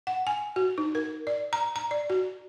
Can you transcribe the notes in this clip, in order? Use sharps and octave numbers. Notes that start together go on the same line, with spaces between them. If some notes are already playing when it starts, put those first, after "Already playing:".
F#5
G#5
F#4
D#4
A#4
D5
A#5
A#5
D5
F#4